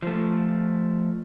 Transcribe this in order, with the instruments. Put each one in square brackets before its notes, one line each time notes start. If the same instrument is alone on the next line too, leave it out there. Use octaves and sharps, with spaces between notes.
[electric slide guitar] F3 A3